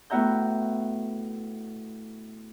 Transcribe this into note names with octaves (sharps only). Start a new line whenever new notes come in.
A2 B3 F#4 E5 A#5 G6